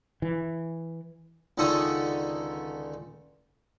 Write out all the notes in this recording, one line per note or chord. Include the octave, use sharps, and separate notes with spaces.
E3
C#2 D3 D#3 A4 C#6 D#6